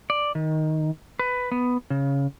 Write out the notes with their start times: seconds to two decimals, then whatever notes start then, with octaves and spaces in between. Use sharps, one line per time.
0.10 D5
0.35 D#3
1.19 B4
1.52 B3
1.90 C#3